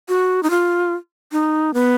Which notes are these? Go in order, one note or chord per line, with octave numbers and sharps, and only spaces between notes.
F#4
D#4
F4
D#4
B3